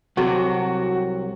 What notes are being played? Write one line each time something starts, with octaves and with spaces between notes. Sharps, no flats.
C2 C3 F#3 F#4